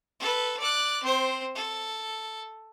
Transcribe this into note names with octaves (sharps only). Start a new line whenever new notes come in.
A4 B4
D5 F#6
C4 C5
A4